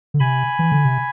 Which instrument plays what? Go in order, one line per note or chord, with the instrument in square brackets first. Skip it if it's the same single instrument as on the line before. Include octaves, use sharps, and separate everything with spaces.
[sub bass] D3
[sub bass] C3 [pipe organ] G#5 B5
[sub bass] E3
D3
C3